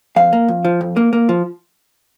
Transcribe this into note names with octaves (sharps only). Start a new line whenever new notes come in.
F2 F5
A#3
F2
F3
F2
A#3
A#3
F3